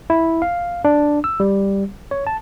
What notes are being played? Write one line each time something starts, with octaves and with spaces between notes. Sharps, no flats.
E4
F5
D4
E6
G3
C#5
A5